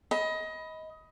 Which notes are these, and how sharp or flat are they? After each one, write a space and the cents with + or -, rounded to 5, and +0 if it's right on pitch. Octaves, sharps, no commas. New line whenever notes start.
D#5 +25 B5 +0